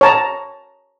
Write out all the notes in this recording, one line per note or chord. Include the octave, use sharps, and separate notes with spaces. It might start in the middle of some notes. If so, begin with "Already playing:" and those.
C#5 A5 A#5